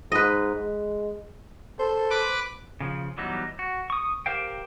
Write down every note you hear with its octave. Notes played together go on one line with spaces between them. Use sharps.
G#2 B4 D#5
G#3
A4 C5
B4 D6
C#3 F3
E3 F#3 G3 B3 D#4
F#4
C#6 D#6
G4 A#4 C5 F5 G5